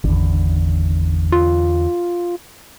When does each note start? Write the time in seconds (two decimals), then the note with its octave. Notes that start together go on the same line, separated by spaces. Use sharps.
0.04 G#1 E2 D3
1.32 F4